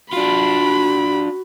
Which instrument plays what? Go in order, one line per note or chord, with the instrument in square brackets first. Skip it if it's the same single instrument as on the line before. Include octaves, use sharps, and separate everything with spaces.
[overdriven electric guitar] D4 F4 [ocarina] F#4 [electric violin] B5